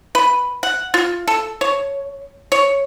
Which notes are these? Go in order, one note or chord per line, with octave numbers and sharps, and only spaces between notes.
B4
F#5
F4
A4
C#5
C#5